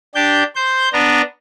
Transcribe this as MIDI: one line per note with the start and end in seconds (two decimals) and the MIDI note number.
0.15 0.43 62
0.15 0.43 67
0.15 0.43 91
0.56 0.89 72
0.56 0.89 91
0.93 1.22 59
0.93 1.22 62
0.93 1.22 82